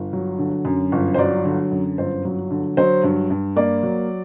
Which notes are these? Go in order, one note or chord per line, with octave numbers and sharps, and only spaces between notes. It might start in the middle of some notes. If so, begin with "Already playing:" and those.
Already playing: G1
F#3
D3
F#2
G1
C5
F#3 D5
D3
F#2
G1 C5
F#3
D3
F#3 C5
G2
G2
A#3 D5
F#3